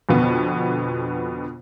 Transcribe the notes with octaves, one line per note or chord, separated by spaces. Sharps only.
F2 B2 D3 B3